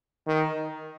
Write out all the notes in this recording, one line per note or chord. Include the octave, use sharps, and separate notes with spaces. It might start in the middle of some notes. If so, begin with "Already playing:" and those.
D#3